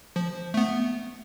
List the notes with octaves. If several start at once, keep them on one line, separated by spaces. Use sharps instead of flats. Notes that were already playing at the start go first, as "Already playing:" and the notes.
F3
A3 B3